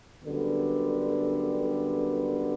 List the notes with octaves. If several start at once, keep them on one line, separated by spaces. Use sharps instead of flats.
F#2 D3 G3 B3